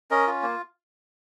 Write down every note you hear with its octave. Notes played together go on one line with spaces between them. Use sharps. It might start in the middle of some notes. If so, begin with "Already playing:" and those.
C#4 A#4 D#5
F4
A#3